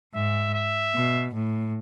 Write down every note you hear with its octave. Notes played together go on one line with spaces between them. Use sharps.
G#2 E5
E5
B2
A2